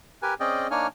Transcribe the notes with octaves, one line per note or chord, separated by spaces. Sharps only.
G4 A#4 B4 G#5
C4 C#4 G#4 D5 D#5 G5
A#3 D4 D#4 C#5 G#5 F6